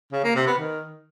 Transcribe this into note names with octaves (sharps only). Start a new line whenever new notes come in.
C#3
A#3
C3
B3
D#3